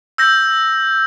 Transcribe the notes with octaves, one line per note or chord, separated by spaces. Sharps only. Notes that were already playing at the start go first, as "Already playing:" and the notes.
E6 G6 A#6